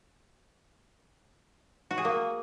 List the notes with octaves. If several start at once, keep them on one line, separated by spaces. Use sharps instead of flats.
F#4
G#4
A#3